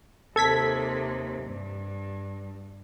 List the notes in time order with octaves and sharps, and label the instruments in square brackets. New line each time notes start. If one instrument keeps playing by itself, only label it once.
[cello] D#2 C3 [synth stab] A4 G#6 B6
[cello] G2